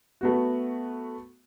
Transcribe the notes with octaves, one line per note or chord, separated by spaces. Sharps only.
A3 B3 F#4